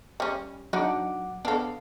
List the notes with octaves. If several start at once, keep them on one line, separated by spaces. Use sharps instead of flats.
G3 C#4
F#3 D4 D#4 F#5 D6
B3 D4 A4 F5